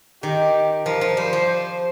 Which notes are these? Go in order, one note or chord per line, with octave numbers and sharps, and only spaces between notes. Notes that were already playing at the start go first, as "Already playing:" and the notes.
D#3 G4
F3 A#4
F3
G3 C5
F3